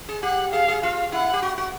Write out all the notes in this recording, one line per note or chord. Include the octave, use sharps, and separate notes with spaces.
G#4
G4 F#5
G#4 F5
G#4
F4 F5
E4 F#5
G4
F#4
F#4